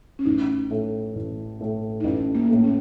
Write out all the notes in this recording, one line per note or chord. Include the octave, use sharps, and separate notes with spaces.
C#4
A1 D#4
A2 A3
A1
A2 A3
D#4
A1 C#4
A#3
A2 A3
C#4